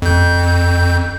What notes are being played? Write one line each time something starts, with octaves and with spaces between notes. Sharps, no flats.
F2 G6